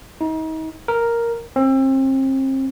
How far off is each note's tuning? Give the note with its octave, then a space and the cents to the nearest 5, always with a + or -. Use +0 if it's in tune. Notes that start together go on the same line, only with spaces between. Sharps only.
D#4 +35
A#4 +0
C4 +35